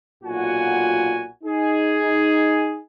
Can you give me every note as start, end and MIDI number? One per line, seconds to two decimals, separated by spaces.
0.24 1.27 35
0.24 1.27 46
0.24 1.27 65
0.24 1.27 66
0.24 1.27 78
0.24 1.27 80
1.44 2.79 63
1.44 2.79 68